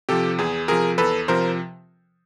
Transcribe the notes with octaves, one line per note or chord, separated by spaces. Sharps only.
C3 F3 G4 A4
E2 G#4
C3 F3 G#4 A#4
E2 A4 B4
C3 F3 A#4 C5